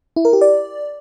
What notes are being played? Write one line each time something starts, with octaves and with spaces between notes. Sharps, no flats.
E4
A#4
G4
D5